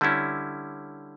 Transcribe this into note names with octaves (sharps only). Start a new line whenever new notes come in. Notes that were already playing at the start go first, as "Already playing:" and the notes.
D3 G3 C#4 E4